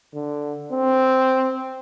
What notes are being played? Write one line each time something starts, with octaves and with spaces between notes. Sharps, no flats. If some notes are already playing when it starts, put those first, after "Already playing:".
D3
C4